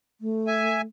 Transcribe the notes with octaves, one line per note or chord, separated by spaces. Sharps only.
A3
E5 G#5